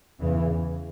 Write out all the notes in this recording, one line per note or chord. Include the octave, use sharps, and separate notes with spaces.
E2 C#3 E3